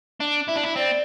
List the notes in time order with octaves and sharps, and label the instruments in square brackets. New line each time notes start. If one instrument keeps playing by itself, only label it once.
[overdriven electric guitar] D4
E4
D4
E4
[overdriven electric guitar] C4 [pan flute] D5